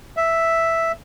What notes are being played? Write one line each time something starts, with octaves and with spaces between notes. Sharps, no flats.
E5